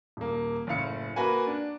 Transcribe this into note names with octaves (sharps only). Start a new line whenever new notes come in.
D#1 A#3
F#1 A2 F5 C#7
A#3 F#4 B4 G#5
D4